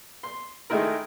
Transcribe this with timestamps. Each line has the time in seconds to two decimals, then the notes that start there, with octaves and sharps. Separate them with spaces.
0.23 C6
0.70 D#3 G#3 A3 E4 A#4